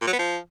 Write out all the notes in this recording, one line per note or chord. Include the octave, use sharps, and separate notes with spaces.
A#2
F#3
B3
F3